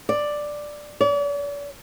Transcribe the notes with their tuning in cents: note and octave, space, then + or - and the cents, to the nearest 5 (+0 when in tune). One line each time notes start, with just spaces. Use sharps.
D5 +5
D5 -45